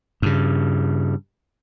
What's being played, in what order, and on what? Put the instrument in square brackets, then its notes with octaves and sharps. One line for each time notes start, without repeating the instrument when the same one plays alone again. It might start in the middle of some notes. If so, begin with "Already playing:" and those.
[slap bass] G2 C#3